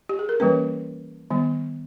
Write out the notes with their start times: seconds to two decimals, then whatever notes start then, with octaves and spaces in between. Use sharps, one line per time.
0.09 G4
0.19 G#4
0.29 A#4
0.40 E3 G3 A#3 C#4 B4
1.31 D#3 G3 B3